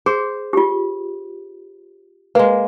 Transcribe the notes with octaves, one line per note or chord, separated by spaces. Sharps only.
G#4 C5
F4 G4
G#3 A#3 B4